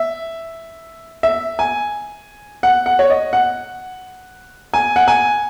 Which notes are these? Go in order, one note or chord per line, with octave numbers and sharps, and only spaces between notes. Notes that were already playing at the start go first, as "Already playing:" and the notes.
Already playing: E5
E5
G#5
F#5
F#5
C#5
D#5
F#5
G#5
F#5
G#5